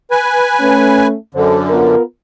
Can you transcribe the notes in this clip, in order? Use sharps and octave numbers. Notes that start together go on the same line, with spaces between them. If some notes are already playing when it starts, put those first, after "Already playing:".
B4 G#5
A3 C#4
F#2 D3 A4 C5
B3 F4 A#4